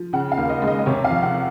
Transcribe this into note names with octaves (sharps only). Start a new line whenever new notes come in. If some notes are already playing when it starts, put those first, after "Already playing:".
Already playing: F3
C#3 F#5
F5
D#2
D#5
G#3
D#5
D#5
C3 C#5
F5
F2
F#5